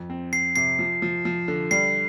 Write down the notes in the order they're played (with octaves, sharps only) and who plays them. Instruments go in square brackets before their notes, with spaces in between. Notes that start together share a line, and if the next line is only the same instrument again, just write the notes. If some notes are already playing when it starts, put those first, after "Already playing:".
Already playing: [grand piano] F2
C4
[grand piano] C4 [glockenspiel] C7
[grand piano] C3 [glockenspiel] C7
[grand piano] F3
F3
F3
D3
[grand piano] G3 [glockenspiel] C7